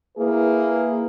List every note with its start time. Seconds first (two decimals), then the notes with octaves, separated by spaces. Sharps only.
0.17 A#3 E4 G#4 B4